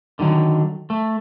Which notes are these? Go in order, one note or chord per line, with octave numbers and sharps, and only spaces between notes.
D3 D#3 F#3
A3